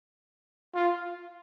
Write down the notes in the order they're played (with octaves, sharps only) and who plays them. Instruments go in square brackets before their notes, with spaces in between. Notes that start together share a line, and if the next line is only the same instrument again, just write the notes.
[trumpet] F4